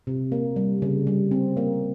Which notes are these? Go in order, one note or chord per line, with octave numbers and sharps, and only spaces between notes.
C3
A#3
G3
C#3
G3
C4
A#3